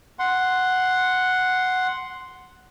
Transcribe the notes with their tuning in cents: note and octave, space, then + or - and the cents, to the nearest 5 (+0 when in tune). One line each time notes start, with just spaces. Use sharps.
F#5 +0 C6 +0